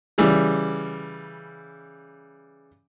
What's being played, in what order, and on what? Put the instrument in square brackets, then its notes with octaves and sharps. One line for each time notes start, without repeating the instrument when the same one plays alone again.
[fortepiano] C#3 E3 G3